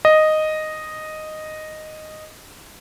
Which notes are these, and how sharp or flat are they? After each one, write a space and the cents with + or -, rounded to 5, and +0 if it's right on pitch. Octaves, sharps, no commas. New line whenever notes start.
D#5 -5